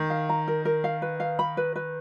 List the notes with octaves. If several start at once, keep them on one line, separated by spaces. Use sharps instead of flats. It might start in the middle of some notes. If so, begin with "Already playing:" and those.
Already playing: D#3
F5
A#5
A#4
A#4
F5
B4
F5
B5
B4
B4